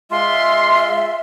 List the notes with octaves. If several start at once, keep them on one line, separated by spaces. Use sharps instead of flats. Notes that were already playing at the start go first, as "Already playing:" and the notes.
G#3 F4 E5 C6